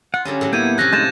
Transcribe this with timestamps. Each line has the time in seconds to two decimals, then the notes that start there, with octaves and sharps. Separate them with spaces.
0.14 F4 F#5
0.25 D3 F#3 G3 C#4
0.41 A2 D3 F#3
0.53 A#3 B3 E4 A4 G6 G#6 D#7
0.78 C3 F3 C#4 F#6 A#6
0.93 G#3 A3 D#4 G6 A6 E7